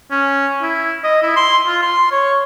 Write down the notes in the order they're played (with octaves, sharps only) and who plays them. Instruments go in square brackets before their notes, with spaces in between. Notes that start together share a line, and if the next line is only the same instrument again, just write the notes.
[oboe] C#4
E4
D#5
E4
C6
F4
C6
C#5